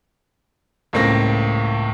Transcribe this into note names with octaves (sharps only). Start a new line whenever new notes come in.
C#2 A2 A#3 C4 A#6